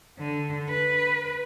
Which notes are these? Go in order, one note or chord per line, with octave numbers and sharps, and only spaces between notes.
D3
B4